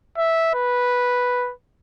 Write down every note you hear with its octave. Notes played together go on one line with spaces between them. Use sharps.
E5
B4